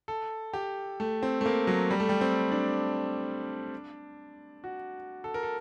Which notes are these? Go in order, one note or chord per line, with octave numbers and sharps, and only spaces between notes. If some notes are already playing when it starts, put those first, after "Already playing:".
A4
G4
A3
C4
A3
A#3
F#3
G3
A3
G3
C4
D4
F#4
A4
A#4
A4